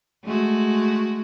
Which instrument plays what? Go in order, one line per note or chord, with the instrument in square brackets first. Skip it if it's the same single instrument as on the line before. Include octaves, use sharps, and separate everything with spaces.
[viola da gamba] G#3 A3 F#4